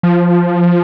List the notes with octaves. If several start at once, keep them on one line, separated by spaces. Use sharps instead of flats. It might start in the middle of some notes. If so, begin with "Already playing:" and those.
F3